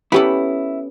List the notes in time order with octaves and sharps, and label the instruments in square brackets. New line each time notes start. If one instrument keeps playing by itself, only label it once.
[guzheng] B3 C#4 A4 [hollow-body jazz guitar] E4 [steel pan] G4 B5